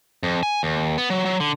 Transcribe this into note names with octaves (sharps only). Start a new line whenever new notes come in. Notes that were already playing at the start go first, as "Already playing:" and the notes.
F2
G#5
D#2
B3
F#3
F#3
D3